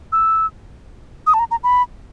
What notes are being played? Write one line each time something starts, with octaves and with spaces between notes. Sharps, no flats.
E6
D#6
A5
A#5
A#5
B5